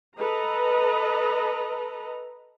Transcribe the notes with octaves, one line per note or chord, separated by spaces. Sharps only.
A4 B4 D#5 A#5